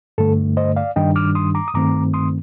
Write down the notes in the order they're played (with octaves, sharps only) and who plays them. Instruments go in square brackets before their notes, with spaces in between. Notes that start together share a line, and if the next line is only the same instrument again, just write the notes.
[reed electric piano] G2 D3 A3 A4
C5 D#5
D5 F5
G2 D#3 G3 D4 D#5 G5
D6 F6
C6 D#6
A#5 D6
D#6
G2 D#3 A3 C4 A#5 D6
C6 D#6